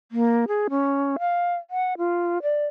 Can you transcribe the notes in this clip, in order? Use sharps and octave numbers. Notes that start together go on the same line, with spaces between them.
A#3
G#4
C#4
F5
F#5
F4
D5